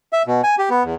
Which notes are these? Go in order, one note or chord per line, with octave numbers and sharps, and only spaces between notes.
E5
B2
G#5
G4
B3
E2